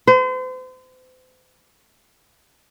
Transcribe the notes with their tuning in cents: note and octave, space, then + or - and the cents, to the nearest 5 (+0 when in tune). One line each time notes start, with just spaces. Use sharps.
C5 -40